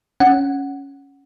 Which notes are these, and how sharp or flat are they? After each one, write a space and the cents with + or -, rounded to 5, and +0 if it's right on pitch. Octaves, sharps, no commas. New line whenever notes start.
C#4 +0 F#5 +0